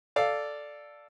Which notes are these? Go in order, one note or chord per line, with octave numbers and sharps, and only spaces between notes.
A4 D5 F5